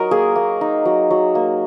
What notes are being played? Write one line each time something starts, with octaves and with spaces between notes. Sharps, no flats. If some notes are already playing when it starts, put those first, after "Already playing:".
Already playing: F#3 D#4 A#4 D#5
A#3 G#4
A#3
D#4
F#3
F#3
A#3